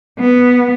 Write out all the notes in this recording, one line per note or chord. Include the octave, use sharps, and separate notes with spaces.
B3